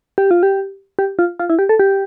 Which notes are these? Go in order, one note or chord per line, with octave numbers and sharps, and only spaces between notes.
G4
F4
G4
G4
F4
F4
E4
G4
A4
G4